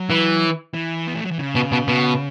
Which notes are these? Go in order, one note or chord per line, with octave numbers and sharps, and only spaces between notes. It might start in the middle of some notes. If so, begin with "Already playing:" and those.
Already playing: F#3
E3
E3
B3
A3
F#3
E3
C#3
B2
B2
B2